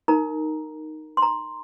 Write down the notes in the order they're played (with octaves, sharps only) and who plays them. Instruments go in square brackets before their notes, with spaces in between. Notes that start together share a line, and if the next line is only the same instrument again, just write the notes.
[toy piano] D#4 A#4 A#5
C6
A#5